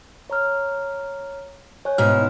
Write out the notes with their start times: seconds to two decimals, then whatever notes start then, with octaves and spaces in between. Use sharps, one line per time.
0.30 C#5 A#5 F6
1.85 C#5 G#5 F#6
1.98 G#2 B2 D#4 E4 F6